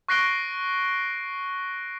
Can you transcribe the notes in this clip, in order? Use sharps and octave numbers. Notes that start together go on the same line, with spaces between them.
C#6 F#6 A#6 C7 D7 G7